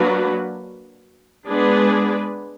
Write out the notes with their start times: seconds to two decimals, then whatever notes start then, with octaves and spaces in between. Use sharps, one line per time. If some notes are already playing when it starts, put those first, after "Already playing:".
Already playing: F#3 A#3 D4 F#4 B4
1.47 G#3 B3 D4 G#4 B4